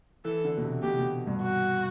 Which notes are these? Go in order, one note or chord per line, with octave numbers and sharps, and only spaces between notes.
E3 A4
D3
B2
C3
B2 G4
B2
G2
F#4